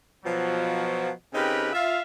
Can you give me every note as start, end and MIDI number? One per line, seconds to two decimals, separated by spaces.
0.25 1.10 47
0.25 1.10 53
0.25 1.10 54
1.34 1.70 49
1.34 1.70 60
1.34 1.70 63
1.34 1.70 67
1.34 1.70 70
1.34 1.70 71
1.73 2.01 65
1.73 2.01 76
1.73 2.01 77